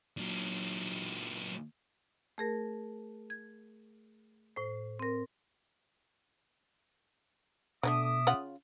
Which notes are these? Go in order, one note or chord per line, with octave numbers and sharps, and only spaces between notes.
A#2 F#3
A3 G#4 A#4
G#6
A2 C5
C4 A#4
B2 D3 F#3 A3 E5 D6 D#6
C#3 F4 F#5